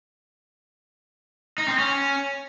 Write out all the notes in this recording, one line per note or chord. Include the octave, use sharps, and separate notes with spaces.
D#4
C4
C#4